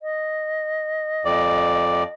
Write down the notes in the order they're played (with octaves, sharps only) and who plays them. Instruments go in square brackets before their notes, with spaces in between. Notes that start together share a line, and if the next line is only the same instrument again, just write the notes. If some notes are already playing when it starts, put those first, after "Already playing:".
[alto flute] D#5
[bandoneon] F2 D5